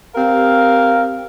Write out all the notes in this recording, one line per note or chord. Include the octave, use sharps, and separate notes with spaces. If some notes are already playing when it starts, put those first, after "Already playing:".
C4 G4 A#4 F5